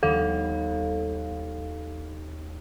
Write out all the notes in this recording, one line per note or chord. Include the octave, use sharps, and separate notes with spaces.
D#2 G3 B3 A4 F5